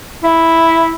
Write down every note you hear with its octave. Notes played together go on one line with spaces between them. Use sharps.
E4